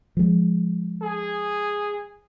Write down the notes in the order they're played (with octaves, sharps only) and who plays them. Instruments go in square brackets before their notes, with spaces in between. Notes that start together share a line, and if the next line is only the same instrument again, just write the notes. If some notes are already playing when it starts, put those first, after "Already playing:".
[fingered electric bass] F3 G#3
[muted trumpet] G#4